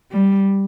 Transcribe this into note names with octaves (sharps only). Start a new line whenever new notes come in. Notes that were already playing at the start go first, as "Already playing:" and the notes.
G3